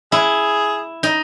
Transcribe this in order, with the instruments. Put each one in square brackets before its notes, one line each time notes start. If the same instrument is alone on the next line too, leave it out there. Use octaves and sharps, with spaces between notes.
[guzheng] E4 [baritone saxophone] G#4
[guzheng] D#4